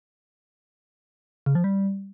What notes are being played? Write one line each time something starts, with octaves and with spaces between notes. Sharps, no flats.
C#3
F3
G3